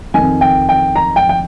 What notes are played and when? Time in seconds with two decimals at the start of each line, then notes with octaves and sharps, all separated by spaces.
0.14 F2 D#3 G#5
0.41 G5
0.69 G5
0.96 A#5
1.16 G5
1.29 G5